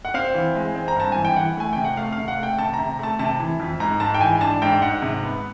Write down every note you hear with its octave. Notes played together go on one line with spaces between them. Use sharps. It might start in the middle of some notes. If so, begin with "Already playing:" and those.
F#5
C4 F5
E3
G#3
C4
A#5
G2 A5
E3 G#5
G5
E3 F#5
A3 G#5
C3 G5
F#5
A3 F5
C3 F5
F#5
A3
G5
C3 A5
C3 A#5
A3 A5
C3 A5
E3
F2
G#2 A#5
G#2 A5
G5
E3 G#5
D4 A5
G#2 G5
G#2 F#5
C3
B3